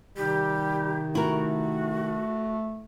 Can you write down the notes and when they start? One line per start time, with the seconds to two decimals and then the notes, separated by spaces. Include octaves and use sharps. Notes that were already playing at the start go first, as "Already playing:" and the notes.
0.17 C3 D#3 G3 D#4 G4
1.15 A3 E4 F#4 A#4